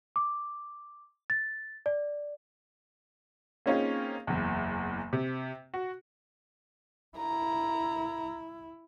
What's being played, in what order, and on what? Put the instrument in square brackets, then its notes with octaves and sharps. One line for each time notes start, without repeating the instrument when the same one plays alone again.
[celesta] D6
A6
D5
[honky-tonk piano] A#3 C4 C#4 D#4 F4 G#4
F#1 E2
C3
F#4
[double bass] E4 [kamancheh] A#5